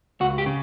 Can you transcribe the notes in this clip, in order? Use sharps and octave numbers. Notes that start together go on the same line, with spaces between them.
C#2 F#4
G4
C#3